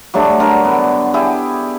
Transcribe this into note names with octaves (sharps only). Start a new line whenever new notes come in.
F#3 G3 A3 D4
D3 A#4
B3
E4 G4 G#4